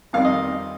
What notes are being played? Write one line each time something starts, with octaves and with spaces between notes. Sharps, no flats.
F2 D#3 G3 C4 D#4 F5
D#5